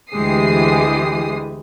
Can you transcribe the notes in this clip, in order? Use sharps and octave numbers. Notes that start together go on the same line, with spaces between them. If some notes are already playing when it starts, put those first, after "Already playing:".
D2 E3 G#3 G4 D#6 C7